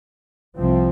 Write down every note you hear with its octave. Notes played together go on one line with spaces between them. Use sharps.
C2 C3 F3 C4